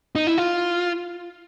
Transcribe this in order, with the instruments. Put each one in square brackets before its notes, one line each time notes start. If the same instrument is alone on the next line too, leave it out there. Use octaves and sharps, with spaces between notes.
[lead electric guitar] D#4
E4
F4